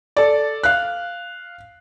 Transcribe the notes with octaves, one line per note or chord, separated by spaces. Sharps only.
A4 D5
F5 F#6